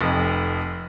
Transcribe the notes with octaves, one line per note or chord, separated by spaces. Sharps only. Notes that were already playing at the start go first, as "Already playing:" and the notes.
F1 F2